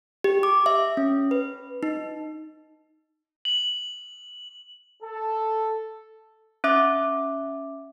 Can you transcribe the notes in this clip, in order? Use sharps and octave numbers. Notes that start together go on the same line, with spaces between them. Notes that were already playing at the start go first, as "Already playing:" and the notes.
G4
D6
E5
C#4
B4
D#4
F#7
A4
C#4 E5 D6